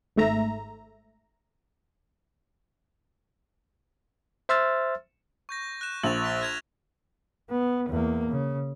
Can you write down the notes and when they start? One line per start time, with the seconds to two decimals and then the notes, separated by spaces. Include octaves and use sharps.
0.16 G#1 G#2 A3 E5 A#5
4.49 C5 E5 C6 E6 F6 A6
5.49 C#6 G6 A#6
5.81 F#6 E7
6.03 A#1 A6 F7 F#7
6.24 F6 A6 B6
6.41 F#6 G#6 F7
7.50 B3
7.89 E2 A#3
8.29 C#3